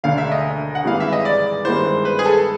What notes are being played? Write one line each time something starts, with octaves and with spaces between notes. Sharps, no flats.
E1 D2 D3 F5
E5
D#5
F#5
G#1 G2 E3 G#3 F5
E5
D#5
D5
G2 D#3 G#3 B3 E4 C5
B4
G#4
A4